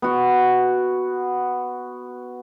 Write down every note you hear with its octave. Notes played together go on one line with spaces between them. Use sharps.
B3 F#4